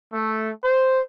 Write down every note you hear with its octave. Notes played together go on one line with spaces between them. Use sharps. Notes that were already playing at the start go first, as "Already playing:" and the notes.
A3
C5